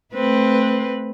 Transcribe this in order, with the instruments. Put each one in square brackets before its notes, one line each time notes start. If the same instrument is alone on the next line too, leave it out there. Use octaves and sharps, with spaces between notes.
[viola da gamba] A3 C4 B4